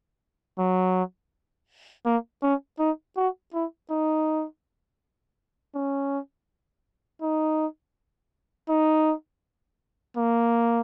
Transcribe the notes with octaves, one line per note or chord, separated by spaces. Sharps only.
F#3
A#3
C#4
D#4
F#4
E4
D#4
C#4
D#4
D#4
A#3